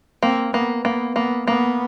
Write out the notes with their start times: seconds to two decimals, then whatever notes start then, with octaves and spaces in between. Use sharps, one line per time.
0.23 A#3 C4
0.53 A#3 B3
0.85 A#3 B3
1.16 A#3 B3
1.47 A#3 B3